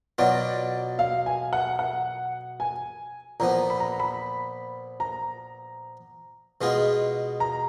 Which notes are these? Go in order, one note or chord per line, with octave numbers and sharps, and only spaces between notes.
B2 F#3 B3 F4 D5
F5
G#5
F#5
F#5
G#5
A#2 F3 B3 A#5
B5
A#5
B5
A#5
B2 G#3 B3 F4 G#4
A#5